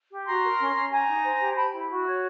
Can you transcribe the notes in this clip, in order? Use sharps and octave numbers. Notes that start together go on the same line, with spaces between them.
G4
F#4 A#5 C6
A#4
C#4
C#4
G4 G#5 A#5
D#4
C5
G4
G4 A5 B5
E4
F#4
C#5